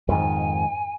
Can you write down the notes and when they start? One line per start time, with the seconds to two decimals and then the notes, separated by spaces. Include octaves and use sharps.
0.09 F2 G#2 D#3 G#5